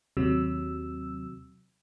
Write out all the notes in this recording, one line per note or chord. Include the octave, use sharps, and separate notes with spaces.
D#2 C3 F#3 E6